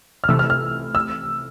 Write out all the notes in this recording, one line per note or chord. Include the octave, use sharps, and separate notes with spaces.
F6
C3 E3 A3 E6
F6
F6
E6